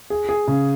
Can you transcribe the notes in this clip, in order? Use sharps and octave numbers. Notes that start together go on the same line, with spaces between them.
G#4
G#4
C#3